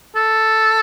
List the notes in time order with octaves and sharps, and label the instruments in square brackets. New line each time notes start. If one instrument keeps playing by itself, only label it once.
[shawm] A4